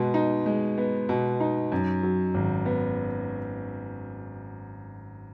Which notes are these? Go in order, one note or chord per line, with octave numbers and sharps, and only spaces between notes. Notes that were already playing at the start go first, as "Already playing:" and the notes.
Already playing: B2 G#3 B3
D#4
G#3
B3
B2
D#4
F#2
F#3
G#1
B3